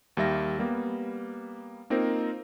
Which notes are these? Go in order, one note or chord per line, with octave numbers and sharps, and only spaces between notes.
D#2 G3 E5 A#6
G3 A#3 B3
A#3 C4 D#4 F4 A#4 C5